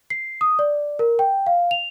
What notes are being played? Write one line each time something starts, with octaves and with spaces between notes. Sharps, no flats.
C7
D#6
D5
A#4
G5
F5
F7